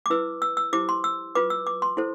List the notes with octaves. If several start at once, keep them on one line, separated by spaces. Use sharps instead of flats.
D6
E4 B4 E6
E6
E6
E4 G4 C5 D6
C6
E6
F4 B4 D6
E6
D6
C6
E4 A4 C5